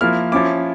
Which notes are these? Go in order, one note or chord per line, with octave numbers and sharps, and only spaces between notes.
F3 A#3 E4 F6
F3 C#4 E4 D6